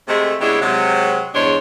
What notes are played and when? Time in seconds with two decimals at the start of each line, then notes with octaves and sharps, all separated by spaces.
0.08 C3 G#3 A3
0.41 C#3 G3 G#3 B3 D4 E4
0.61 C3 F#3 G#3
1.35 E2 G2 G#3 D4 C5 C#5